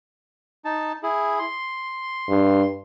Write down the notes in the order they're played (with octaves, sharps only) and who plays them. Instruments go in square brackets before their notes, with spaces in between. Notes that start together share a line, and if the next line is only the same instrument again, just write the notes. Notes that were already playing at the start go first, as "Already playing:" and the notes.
[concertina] D#4 A5
E4 G#4
C6
[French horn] G2